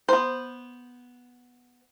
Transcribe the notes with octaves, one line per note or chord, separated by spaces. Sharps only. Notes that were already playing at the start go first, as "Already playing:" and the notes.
B3 C5